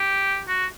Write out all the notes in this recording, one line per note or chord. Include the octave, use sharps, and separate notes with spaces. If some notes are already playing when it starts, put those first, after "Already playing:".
Already playing: G4
F#4